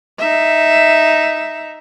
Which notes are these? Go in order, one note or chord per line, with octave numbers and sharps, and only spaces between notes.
D#4 E5